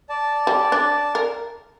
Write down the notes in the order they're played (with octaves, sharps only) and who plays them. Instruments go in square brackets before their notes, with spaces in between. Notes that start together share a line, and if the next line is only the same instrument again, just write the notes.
[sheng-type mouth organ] D5 A5
[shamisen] G3
D4
A#4